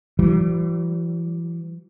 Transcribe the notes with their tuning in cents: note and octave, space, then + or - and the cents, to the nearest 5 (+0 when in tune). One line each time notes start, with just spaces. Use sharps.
E3 +35 G3 -45